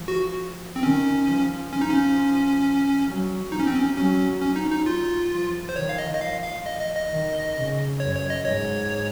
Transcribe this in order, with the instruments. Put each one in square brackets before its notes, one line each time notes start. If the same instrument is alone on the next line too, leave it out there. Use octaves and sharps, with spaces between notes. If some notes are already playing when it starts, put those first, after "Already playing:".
Already playing: [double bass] F3
[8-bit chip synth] F#4
C4
[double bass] D#3 [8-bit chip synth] C#4
[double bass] F3
[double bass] F3 [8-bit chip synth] C#4
[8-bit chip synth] D#4
C#4
[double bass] F#3
[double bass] F3 [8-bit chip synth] D#4
[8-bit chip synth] C#4
C4
C#4
[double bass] F#3 [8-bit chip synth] C#4
[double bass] F#3 [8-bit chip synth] C#4
[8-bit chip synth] D#4
D#4
F4
[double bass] F3
[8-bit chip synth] C5
[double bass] D#3 [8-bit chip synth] C#5
[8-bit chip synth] F5
D#5
D#5
[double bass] F3 [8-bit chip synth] F5
[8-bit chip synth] F5
D#5
D#5
D#5
[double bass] D#3
C#3
[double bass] F#2 [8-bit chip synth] C#5
[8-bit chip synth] C#5
D#5
[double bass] G#2 [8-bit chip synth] C#5